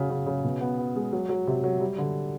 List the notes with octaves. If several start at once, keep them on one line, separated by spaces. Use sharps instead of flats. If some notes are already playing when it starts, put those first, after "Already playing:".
Already playing: C#3 F#3
C#3
C#3
B2
B3
B3
G#3
F#3
F#3
C3
F#3
G3
D3